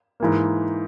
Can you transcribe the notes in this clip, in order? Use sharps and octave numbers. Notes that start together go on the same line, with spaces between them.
G#2 E3 A#3